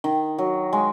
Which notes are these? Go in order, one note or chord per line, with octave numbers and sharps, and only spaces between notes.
D#3
F#3
G#3